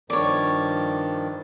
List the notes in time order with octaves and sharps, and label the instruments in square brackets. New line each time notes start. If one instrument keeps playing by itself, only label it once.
[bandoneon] G2 D#3 F3 [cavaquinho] C#5 D5